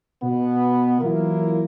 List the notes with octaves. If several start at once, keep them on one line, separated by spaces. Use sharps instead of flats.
B2 B3
E3 F#3 A#3 E4 F4 A#4